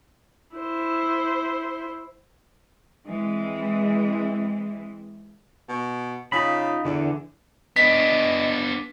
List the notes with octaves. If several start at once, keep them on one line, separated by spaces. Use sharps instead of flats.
E4 C5
E3 G#3 C4
B2
C#3 D#4 F4 B5
E2 D3 E3
B3 D4 D#5 B6